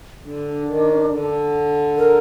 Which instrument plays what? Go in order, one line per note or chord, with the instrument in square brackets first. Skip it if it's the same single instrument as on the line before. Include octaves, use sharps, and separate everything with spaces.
[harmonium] D3 [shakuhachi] D4
[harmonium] D#3
D3
[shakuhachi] A#4